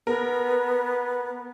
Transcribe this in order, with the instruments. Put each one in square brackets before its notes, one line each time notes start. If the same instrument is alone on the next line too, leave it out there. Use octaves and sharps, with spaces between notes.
[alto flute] B3 [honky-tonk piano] A#4